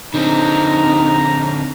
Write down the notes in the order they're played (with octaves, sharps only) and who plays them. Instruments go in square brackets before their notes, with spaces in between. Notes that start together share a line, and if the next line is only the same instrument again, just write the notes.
[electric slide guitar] D3 C4 [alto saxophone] D#4 [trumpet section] A#5